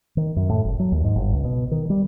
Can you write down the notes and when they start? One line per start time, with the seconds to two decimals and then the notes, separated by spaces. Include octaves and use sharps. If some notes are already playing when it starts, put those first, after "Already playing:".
0.17 D#3
0.36 F#2
0.50 A2
0.65 F#1
0.79 F#3
0.92 D#2
1.04 G#2
1.16 G1
1.32 C#2
1.45 B2
1.71 D#3
1.90 G3